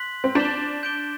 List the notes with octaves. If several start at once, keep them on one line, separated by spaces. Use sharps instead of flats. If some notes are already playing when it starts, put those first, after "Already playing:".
Already playing: C6 F#6 B6 F#7
C4
D4 G6 B6 E7 G7
G6 D7 G7